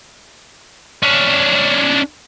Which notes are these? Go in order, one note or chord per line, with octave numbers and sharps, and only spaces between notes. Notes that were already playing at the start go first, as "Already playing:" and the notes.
C#4 D4